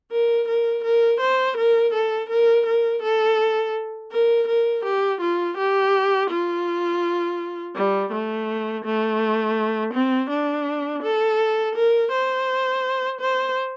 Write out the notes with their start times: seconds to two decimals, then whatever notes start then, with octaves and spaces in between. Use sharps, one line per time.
0.12 A#4
0.48 A#4
0.84 A#4
1.21 C5
1.57 A#4
1.94 A4
2.30 A#4
2.66 A#4
3.03 A4
4.12 A#4
4.48 A#4
4.85 G4
5.21 F4
5.57 G4
6.30 F4
7.76 G3
8.12 A3
8.85 A3
9.94 C4
10.30 D4
11.03 A4
11.76 A#4
12.12 C5
13.21 C5